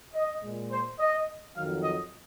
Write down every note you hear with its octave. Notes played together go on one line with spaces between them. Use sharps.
D#5
A#2 G#3
C5
D#5
F2 D#3 F#3 F5
D#5